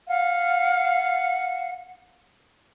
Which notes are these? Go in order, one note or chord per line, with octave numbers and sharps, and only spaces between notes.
F5 F#5